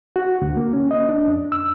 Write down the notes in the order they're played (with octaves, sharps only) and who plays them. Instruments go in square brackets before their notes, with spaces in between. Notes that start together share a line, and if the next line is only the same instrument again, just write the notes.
[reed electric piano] F#4
D2
A#3
C#4
D#5
D4
F2
E6